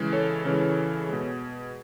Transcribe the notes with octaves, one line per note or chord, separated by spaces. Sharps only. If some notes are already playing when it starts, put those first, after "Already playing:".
Already playing: C#3 E3 G#3
A4 C#5
C#3 E3 G#3
B2 G#3